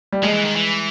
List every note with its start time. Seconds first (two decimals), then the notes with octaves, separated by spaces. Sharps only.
0.13 G3
0.23 F3 G#3
0.34 E3
0.45 D#3
0.56 E3